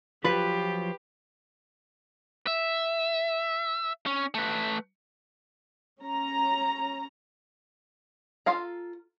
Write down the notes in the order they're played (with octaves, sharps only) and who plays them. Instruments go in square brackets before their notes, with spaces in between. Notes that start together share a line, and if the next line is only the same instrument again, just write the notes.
[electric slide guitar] F3 F#3 F4 [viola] G4 [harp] B4
[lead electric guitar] E5
C#4
A3 B4
[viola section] C#4 A#5
[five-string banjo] F4 A4 F5 A#5